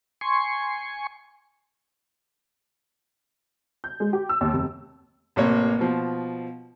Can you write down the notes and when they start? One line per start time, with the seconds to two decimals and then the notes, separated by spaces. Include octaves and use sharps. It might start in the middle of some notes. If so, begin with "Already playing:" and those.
0.21 G#5 C6 C#6
3.84 G6
4.00 G#3
4.13 G4
4.29 E6
4.41 D#2
4.53 F1
5.36 A1 C3 A#3 C#5
5.79 B2 F3